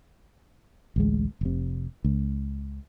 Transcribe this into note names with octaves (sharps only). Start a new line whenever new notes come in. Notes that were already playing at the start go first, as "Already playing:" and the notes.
A1 D2 G#3
F1 C3
C#2